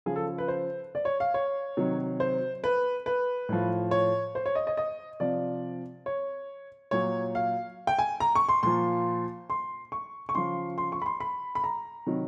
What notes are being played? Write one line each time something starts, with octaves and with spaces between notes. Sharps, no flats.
C#3 F3 G#4
A4
B4
C5
D5
C#5
F5
C#5
C3 D#3 F#3
C5
B4
B4
A2 F3
C#5
C5
C#5
D#5
D#5
D#5
C3 F3 D5
C#5
A#2 F#3 C#5
F5
G5
G#5
A#5
C#6
C6
A#2 F3 C6
C6
C#6
C#6
C#3 F3 C6
C6
C#6
B5
C6
B5
B5
A#5
C3 D#3 F#3